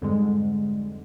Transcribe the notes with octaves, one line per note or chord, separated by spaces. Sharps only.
F2 G#2 D3 G3 G#3